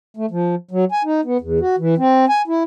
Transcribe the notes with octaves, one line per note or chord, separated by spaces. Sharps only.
A3
F3
F#3
G#5
D#4
B3
E2
F#4
E3
C4
G#5
E4